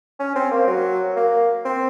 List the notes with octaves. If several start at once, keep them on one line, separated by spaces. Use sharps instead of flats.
C#4
C4
A#3
F#3
A#3
C4